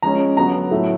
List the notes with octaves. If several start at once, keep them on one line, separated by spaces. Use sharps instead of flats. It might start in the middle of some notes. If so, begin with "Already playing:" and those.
F3 G#3 C#4 A#5
D3 F#3 B3 A#5
A2 F#3 A3